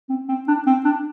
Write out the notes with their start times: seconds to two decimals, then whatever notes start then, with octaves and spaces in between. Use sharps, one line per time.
0.09 C4
0.28 C4
0.48 D4
0.66 C4
0.85 D4